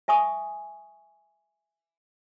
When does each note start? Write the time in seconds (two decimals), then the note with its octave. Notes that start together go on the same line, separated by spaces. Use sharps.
0.08 E5 G#5 C#6 D#6